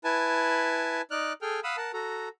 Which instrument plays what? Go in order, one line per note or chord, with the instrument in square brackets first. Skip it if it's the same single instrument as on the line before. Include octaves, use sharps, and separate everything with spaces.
[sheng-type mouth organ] E4 B4 G#5 A5
D#4 D5 F6 F#6
G#4 A4 G5 F6
F5 F#5 B5 D#6 E6
A#4 F#5 A5
F#4 A4 A#5